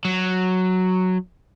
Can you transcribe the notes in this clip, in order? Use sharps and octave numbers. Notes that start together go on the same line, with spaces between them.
F#3